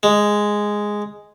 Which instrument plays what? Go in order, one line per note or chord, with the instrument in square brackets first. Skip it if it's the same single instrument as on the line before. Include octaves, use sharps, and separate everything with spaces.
[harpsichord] G#3